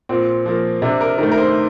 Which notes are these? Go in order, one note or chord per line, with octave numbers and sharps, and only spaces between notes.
A#2 C4
F3 A#3
C3 D4
A#4
D#3 A3 A#4
A#4
C5